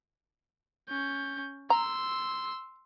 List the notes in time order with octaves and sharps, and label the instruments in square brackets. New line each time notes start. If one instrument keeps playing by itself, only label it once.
[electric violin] C#4 G6
[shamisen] A#5 [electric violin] C6 E6